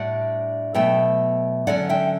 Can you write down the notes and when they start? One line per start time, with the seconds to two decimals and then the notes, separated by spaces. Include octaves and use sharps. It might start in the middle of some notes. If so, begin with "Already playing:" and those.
Already playing: A2 G3 D4 D5 F#5
0.74 B2 F#3 A3 E5 G5
1.67 D3 F#3 C#4 D5 F#5
1.89 E5 G5